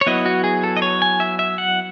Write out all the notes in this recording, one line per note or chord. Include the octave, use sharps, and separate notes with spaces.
C#5
F#3 B3 E4 D#5
F#4
G#4
A4
D#5
C#5
G#5
E5
E5
F#5